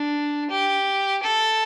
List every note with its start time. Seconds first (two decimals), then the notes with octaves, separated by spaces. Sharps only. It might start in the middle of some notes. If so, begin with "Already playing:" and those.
Already playing: D4
0.50 G4
1.23 A4